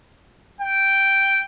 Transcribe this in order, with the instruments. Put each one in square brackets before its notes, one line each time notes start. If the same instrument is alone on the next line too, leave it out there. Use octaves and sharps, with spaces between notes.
[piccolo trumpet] G5